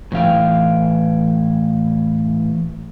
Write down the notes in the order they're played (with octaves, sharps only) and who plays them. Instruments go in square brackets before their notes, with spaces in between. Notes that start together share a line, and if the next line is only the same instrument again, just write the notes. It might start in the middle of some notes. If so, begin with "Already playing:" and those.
[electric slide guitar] A2 E3 F5 G5